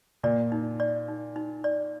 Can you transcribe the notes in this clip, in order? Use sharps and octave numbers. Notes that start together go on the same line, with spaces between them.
A#2 D5
D#4
D5
D#4
D#4
D5